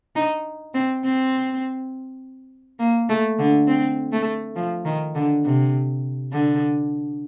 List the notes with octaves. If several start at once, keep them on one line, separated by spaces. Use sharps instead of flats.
D#4
C4
C4
A#3
A3
D3
C4
A3
F3
D#3
D3
C3
D3